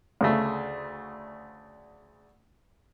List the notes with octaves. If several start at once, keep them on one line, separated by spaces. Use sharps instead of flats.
D2 C#3 A3